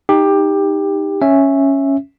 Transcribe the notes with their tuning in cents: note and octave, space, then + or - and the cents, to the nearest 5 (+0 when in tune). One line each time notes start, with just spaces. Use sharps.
D#4 +0 G4 +15
C#4 -5 E5 +0